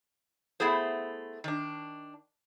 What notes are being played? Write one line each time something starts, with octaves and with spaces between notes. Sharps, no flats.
A3 B3 E4 G#4 C5
D#3 D4